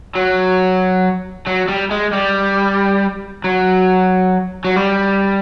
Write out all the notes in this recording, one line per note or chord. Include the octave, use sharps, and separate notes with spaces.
F#3
F#3
G3
G#3
G3
F#3
F#3
G3